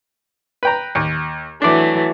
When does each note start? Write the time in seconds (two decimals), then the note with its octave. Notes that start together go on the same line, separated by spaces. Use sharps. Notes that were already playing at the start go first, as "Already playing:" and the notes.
0.63 B4 G5 A#5
0.95 D#2
1.62 E3 F#3 A3 D4 D5